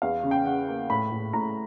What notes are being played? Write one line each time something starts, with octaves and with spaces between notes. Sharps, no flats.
E2 F5
C#3
G5
C#3 F#5
A#3
A2 B5
A2
A2 A#5